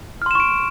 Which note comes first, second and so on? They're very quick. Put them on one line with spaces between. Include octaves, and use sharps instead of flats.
F6 C6 E7 C#6 D7